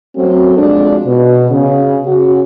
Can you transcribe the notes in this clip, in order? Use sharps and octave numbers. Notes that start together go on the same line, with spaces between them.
F#2 F#3 A3 C4 F#4
F2 G#3 D4
B2
C#3
C#3 F#4